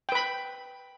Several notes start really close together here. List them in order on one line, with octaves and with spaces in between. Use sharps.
G5 B4 B5